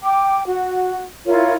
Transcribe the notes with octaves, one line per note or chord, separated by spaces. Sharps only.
G5 D6
F#4
E4 F4 A#4 C#5